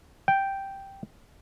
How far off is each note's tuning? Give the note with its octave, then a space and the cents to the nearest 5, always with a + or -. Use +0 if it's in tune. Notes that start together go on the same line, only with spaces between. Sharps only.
G5 -5